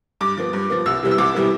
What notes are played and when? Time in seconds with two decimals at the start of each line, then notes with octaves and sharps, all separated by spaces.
0.21 G2 D6
0.38 F3 B3
0.53 G2
0.70 F3 B3
0.86 C2 E6
1.03 C3 E3 G3 B3
1.11 E6
1.18 C2 D6
1.35 C3 E3 G3 B3